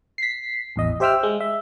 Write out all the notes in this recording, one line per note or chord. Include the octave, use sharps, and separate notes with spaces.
B6 C7
A1 E2 D#5
G4 C5 E5 G5 E6 F6
G#3
E5